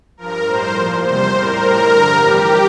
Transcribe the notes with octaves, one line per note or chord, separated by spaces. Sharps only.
G2 F3 A#4
A2 G3 C5
A#2 F3
E2 C3 G3 C5
A2 G3 A#4
A2 G3
G2 D3 F3
F2 E3 G3 G4